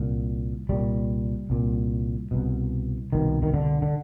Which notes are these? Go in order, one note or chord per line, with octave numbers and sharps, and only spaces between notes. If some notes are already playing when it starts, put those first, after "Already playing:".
Already playing: C2 A#2
C2 A#2 G3
C2 A#2
C2 B2
C2 B2 D#3
D#3
D3
D3